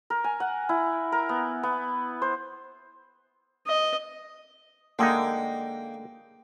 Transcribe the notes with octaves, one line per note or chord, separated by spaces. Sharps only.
A#4
G#5
F#5
E4
A#4
B3
B3
C5
D#5
D3 G#3 A#3 D#4 G5